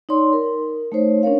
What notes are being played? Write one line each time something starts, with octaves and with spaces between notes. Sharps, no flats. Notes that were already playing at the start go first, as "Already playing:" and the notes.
D#4 C#5 D5 C6
A#4
A3 D#4 C5 C#5
C#4 D4 A#4 C#5 F5